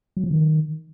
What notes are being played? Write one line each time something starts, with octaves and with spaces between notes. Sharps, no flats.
F#3
F3
D#3